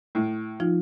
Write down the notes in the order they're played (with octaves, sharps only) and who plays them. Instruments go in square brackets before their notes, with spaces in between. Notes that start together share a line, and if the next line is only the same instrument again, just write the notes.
[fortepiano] A2
[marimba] F3 D#4 F4